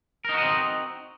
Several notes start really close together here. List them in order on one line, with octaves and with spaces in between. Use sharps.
A#4 D#4 F#4 D#5 C4